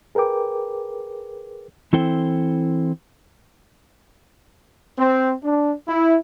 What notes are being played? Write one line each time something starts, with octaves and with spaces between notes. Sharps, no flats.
G#4 A#4 B4 G5 D6
E3 C4 E4 A4 C5 G5
C4
D4
E4